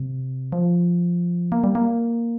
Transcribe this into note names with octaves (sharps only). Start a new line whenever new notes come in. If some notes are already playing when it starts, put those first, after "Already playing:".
Already playing: C3
F3
A#3
G3
A#3